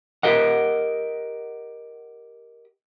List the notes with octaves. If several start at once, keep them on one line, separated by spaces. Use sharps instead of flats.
G4 A#4 D#5 F#5